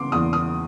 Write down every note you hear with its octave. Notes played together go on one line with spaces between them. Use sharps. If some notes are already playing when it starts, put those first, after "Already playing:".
Already playing: C#3 B3 C6 D6
E2 D#6
D#6